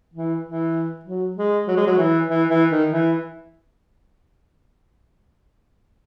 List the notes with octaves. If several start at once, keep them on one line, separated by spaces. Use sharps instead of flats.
E3
E3
F#3
G#3
F#3
G#3
F#3
E3
E3
E3
D#3
E3